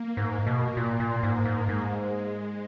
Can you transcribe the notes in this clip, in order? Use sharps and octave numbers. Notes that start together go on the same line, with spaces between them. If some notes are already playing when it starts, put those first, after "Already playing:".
Already playing: A#3
G#2
B2
A#2
A#2
G#2
G#2
G#2 G#3